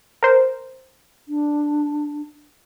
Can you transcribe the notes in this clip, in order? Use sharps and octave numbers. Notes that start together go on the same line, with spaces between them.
A#4 C5
D4